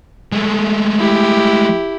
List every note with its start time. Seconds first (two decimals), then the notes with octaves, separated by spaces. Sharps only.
0.32 G#3 A3
0.99 E4 G4